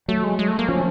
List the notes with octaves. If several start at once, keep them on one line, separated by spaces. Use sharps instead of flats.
F#3 A3
G#3
G#3
A3
A#3
F3 C#4